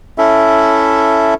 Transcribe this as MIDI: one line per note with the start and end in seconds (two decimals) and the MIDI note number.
0.18 1.34 61
0.18 1.34 64
0.18 1.34 69
0.18 1.34 76